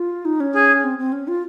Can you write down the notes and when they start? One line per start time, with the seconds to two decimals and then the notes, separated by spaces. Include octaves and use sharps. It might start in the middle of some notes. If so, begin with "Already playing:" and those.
Already playing: F4
0.25 D#4
0.40 C#4
0.55 G#4
0.84 C4
0.99 C4
1.12 C#4
1.28 F4